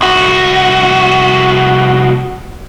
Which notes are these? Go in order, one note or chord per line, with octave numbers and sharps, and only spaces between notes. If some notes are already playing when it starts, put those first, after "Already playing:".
C2 F#4